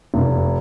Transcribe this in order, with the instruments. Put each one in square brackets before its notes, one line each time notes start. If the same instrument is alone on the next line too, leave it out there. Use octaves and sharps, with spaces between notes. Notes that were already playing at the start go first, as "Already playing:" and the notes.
[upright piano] F1